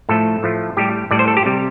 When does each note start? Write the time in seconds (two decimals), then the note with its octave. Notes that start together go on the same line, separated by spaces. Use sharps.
0.09 A2 F3 A3 A4
0.43 A2 F3 A3
0.77 A2 G3 G4
1.11 A2 G3 D5
1.19 C5
1.28 A4
1.37 G4
1.45 C3 G3